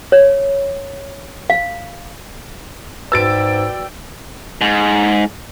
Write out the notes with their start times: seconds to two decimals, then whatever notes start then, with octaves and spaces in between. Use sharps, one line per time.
0.12 C#5
1.50 F5
3.12 G#2 F#4 B4 D5 G5 E6 A6 D7
4.61 G#2